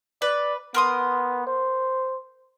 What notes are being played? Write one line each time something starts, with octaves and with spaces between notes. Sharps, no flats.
B4 D5
B3 A#4 C6 D#6
C5